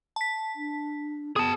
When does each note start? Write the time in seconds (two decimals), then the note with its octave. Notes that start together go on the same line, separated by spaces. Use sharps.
0.16 A5 B6
0.56 D4
1.36 B3 G#4 A5